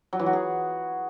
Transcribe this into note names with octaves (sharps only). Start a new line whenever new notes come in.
F#3
E3
F#4
G#4